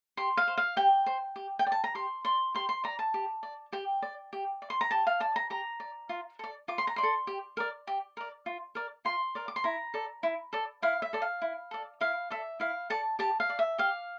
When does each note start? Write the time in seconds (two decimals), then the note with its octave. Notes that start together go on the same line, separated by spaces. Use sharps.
0.17 G4 C6
0.37 F5
0.48 C5
0.58 F5
0.77 G4 G5
1.06 C5
1.36 G4
1.59 G5
1.66 D5
1.72 A5
1.84 A#5
1.95 G4 C6
2.25 D5 C6
2.55 G4 C6
2.69 C6
2.84 D5 A#5
2.99 A5
3.14 G4
3.43 D5
3.73 G4 G5
4.02 D5
4.33 G4
4.62 D5
4.70 C6
4.81 A#5
4.91 G4 A5
5.07 F5
5.20 D5 A5
5.36 A#5
5.50 G4 A#5
5.80 D5
6.09 F4
6.39 A4 D5
6.68 F4 D6
6.78 C6
6.87 A#5
6.96 D5 C6
7.03 A4
7.27 G4
7.57 A#4 D5
7.87 G4
8.17 A#4 D5
8.46 F4
8.75 A#4 D5
9.05 F4 C6
9.35 A#4 D5
9.48 D6
9.56 C6
9.64 E4 A#5
9.94 A4 D5
10.23 E4
10.53 A4 D5
10.82 E4 F5
11.02 E5
11.13 A4 D5
11.22 F5
11.42 E4
11.71 A4 D5
12.01 E4 F5
12.30 A4 D5 E5
12.60 E4 F5
12.90 A4 D5 A5
13.19 G4 A5
13.40 F5
13.50 D5
13.59 E5
13.78 G4 F5